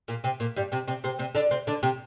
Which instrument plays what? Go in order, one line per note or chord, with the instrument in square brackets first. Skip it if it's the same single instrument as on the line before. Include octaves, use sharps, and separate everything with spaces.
[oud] A#2 A#3
C3 C4
A#2 A#3
G2 G3
C3 C4
C3 C4
C3 C4
C3 C4
D3 D4
C3 C4
D3 D4
C3 C4